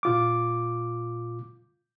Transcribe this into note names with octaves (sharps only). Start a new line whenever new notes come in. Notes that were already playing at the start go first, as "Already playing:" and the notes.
A#2 F4 D6